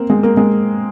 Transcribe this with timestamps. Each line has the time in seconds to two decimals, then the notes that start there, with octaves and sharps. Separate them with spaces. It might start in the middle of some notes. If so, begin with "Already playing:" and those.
Already playing: A#3 C4
0.10 G#3
0.23 A#3
0.37 G#3